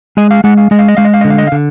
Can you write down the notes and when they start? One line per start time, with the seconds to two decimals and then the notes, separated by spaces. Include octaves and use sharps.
0.17 G#3 D#5
0.31 F5
0.44 G#3 F#5
0.57 F5
0.71 G#3 D#5
0.79 F5
0.88 D#5
0.97 G#3 F5
1.05 D#5
1.14 F5
1.21 D3 D#5
1.30 F5
1.38 D#5
1.47 F5
1.52 D3